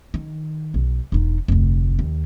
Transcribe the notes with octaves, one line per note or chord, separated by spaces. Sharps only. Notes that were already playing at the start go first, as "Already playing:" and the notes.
D#3
B1
E1 D#4
F1 D2
D#2